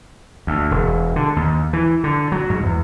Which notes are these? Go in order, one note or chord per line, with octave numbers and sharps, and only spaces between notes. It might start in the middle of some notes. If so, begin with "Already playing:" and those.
D2
E1
D3
D#2
E3
D3
F#3
G#2
E2